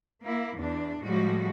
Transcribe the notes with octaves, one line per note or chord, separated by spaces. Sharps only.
A#3 E4
E2 D4
A2 F3 G3 G#3 F#4